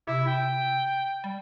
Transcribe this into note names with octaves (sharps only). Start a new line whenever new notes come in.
C3 E4
G5
G3